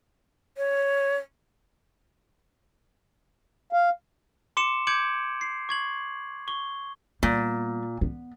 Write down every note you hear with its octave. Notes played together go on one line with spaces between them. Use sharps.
C#5
F5
C6 D6 C#7 E7
D6 G6 G#6 C#7 D7 F#7
C7
C#6 G#6 F#7
C#6 G7
A#2 G3 B3
B3